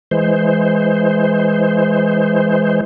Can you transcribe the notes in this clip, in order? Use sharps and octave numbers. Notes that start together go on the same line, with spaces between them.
E3 G#3 C5